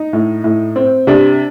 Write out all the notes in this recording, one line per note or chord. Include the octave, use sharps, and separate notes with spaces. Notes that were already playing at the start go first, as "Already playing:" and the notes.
Already playing: D#4
A2
A2
C4
C3 D4